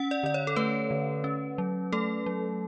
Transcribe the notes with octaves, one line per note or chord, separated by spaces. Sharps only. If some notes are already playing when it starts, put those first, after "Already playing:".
Already playing: C#4 F#5
D5
D3 D5
C#5
A4
A3 B4
D3
C#4
F#3
A3 A4
F#3